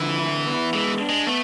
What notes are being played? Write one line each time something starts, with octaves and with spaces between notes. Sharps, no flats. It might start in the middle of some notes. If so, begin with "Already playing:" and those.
Already playing: D3 E3 F3
E4
B3
E3 G#3
D4
G#3
A3 B3